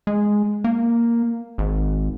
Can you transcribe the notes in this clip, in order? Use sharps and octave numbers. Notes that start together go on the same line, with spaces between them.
G#3
A#3
G#1